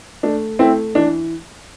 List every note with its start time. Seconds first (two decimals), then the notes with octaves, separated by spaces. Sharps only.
0.23 A3 D4
0.59 A3 C4 E4
0.95 E3 D4